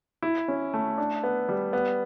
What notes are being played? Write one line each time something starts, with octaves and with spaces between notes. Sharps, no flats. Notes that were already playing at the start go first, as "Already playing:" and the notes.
E4
C#4
A3
D4
B3
G3
B3